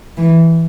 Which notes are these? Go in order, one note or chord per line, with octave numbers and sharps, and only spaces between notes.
E3